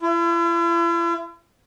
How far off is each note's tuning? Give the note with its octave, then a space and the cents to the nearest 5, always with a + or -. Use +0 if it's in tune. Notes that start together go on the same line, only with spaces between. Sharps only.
E4 +45